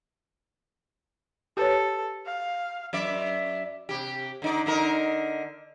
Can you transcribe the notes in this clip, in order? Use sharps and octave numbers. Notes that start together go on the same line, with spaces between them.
G4 A4 B4 C#5
F5
F#2 D5 E5
C3 G4
D3 D#4 D5
D3 D#4 A#4